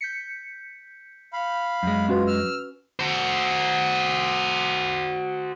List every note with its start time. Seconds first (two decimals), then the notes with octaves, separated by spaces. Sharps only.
0.01 G6 B6 C#7
1.33 F5 B5
1.83 F#2 G#3
2.08 C#4 F4 F#4 B4
2.27 E6 F6
2.99 F#4 C5